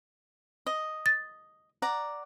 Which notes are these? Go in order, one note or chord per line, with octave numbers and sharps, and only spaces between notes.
D#5
A6
D5 F#5 A#5